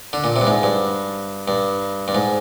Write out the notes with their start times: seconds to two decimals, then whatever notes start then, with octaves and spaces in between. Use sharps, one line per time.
0.13 D3
0.24 A#2
0.36 C3
0.41 G2
0.47 G#2
0.63 G2
1.48 G2
2.08 G2
2.15 G#2